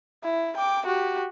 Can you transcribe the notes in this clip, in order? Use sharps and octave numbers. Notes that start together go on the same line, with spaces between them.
E4
G5 D6
F#4 G4